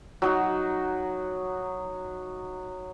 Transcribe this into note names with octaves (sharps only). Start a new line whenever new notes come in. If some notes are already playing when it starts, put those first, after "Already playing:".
F#3 D#4 F#4